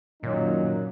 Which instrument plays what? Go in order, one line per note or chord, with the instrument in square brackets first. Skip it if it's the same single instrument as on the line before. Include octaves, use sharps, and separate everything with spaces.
[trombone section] F#2 D#4 [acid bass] A#2 [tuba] D#3 [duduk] F#3